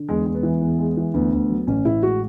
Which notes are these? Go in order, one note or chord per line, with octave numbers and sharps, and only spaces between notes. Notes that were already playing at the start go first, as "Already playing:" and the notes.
Already playing: D3
E2 G#3
G#3
B3
E3
E2
G#3
E3
D2 B3
D2
F#3
A1 C#4
A1 E4
G#3 F#4